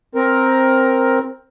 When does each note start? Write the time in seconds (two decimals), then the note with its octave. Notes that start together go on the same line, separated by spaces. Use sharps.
0.15 C4 A#4